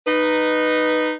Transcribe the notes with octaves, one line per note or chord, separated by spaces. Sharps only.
D#4 B4